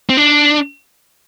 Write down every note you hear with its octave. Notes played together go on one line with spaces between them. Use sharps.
C4
D4